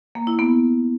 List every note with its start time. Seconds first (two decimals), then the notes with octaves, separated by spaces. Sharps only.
0.15 A#3
0.27 E4
0.39 B3